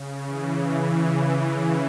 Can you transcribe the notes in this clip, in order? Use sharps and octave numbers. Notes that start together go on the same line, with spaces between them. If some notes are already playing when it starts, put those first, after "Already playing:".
Already playing: C#3
E3
E3